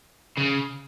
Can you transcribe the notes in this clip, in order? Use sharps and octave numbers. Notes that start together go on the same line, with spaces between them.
C#3